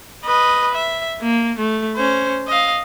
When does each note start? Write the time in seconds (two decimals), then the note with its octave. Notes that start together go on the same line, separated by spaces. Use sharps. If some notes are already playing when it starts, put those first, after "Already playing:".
0.25 B4 D#5
0.74 E5
1.21 A#3
1.59 A3
1.96 C#4 C5
2.47 D#5 F5